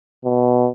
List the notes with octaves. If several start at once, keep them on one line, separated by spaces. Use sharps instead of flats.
B2